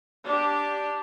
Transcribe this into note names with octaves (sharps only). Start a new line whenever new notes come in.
D4 G4